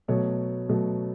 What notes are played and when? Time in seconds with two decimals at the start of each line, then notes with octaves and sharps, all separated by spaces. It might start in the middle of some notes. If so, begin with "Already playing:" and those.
0.08 B2 F#3 A3 C#5
0.69 B2 F#3 A3